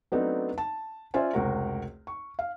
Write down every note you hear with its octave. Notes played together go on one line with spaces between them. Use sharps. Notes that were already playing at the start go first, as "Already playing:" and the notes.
F#3 A3 B3 C4 D4 D#4
A5
C#4 F4 C5 D5 E5 G#5
F1 C#2 F#4 A#4
C#6
F5